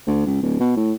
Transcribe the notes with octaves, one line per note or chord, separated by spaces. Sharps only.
D2
C#2
D1
B2
A2